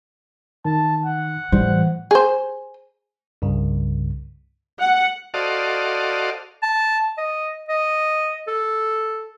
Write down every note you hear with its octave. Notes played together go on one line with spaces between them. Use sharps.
D#3 A5
F#5
A2 E3 G3 C5
G#4 C5
C2 G2 C#3
F#5
F#4 A4 C5 D5 D#5 F5
A5
D#5
D#5
A4